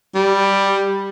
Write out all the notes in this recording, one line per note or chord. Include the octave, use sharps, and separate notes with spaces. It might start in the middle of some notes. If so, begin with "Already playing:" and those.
G3